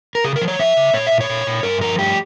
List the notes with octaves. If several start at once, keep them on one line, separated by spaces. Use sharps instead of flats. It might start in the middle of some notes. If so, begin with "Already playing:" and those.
A#4
C#3 G#4
A#4
F3
C#5
F3 E5
C#3
A#2 C#5
E5
A#2
C#5
A#2
A#2
G2 A#4
F3 A#4
G2 G4